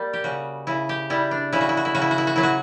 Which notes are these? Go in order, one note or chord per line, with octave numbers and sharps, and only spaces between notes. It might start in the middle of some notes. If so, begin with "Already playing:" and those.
Already playing: G3 A#3
G4
C#3 F#4
C#3 E4
G4
G3 E4
D4
C#3 E4
F#4
E4
F#4
E4
C#3 F#4
E4
F#4
E4
F#4
F#3 E4
F#4